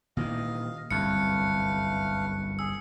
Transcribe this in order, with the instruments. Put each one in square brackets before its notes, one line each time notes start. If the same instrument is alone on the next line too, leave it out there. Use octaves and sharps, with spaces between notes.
[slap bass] A#2 D#3 E3 [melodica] D#5 F5
[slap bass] G1 C2 F#2 [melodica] A3 B4 F5 [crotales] C#7
[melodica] G#4 [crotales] E6